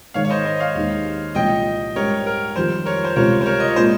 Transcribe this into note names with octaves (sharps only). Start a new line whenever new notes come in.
G#2 D#3 G#3 C#5 F5
C#5
C5 D#5
C5 D#5
C#5 F5
D#2 D#3 G#3 D#4
C2 A#2 F3 G#3 C#4 D#5 G5
G#2 G3 C#4 G4 A#4 C#5
A#4
F2 D#3 G3 C5
A#4 C#5
C5
C#2 C3 G3 C#4 A#4 C#5
C5
A#4 C#5
D#5
C#5
A#2 G#3 C4 C5